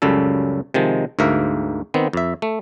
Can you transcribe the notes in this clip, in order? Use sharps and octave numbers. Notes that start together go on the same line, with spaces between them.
C#2 F#2 C#3 G3 A4
C3 D#3 F3 G#3
D2 G#2 A#3 A#4 E5
D#3 B3 C4
F2 E5
A3